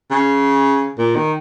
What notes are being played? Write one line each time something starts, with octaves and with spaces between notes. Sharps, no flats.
C#3
A#2
D#3